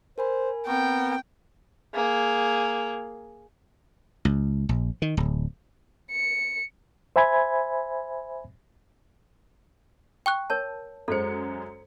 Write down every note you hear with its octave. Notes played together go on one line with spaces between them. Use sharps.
A#4 C5 G#5 B5
B3 C4 A#4 G5 C#6
A#3 G#4
C#2
A#1
D#3
D1
C#7
C5 E5 G#5 B5 G#6
G5 C#6 F#6
A#4 C#5 A5
F#2 G#3 A4 C5 C#7